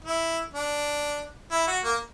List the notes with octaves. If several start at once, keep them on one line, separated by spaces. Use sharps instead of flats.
E4
D4
E4
F#4
A#3